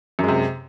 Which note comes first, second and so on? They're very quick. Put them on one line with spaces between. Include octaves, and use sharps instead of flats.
F#2 G#3 C3